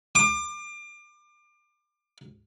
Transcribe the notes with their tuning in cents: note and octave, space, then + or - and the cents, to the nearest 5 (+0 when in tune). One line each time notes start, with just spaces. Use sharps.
D6 +30